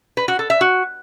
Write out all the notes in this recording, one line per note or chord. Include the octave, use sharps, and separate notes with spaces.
B4
F#4
A4
E5
F#4